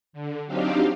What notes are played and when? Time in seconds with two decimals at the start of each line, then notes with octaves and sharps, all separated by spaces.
0.13 D3
0.47 F#3 C4 D4 D#4 G4 F5